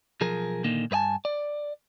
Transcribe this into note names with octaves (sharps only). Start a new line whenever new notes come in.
B1 F3 G#4 A#4
A#2 D3 D#3 A#3
G2 B4 D#5 G#5 A5
D5